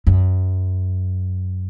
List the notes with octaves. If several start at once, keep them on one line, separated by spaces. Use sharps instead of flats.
F#2